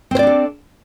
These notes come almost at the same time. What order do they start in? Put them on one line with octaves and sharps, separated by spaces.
C4 C5 D5 D4 A4